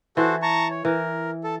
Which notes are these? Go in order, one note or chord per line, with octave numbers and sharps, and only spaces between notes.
E3 F#4 A4 C5
A5 A#5 C#6
C#5
E3 A#4
A4